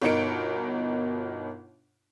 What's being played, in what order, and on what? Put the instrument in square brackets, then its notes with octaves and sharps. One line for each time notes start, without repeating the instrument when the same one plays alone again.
[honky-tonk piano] G1 B2 D#4 A#4 C#7 D7